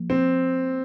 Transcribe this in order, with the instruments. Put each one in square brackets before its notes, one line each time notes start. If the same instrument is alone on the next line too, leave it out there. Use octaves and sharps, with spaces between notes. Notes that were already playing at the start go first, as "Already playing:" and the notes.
Already playing: [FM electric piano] F3 A#3
[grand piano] C4